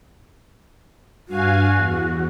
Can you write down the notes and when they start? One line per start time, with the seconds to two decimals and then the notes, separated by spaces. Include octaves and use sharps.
1.28 G2 F#4 F5 G#5
1.75 E2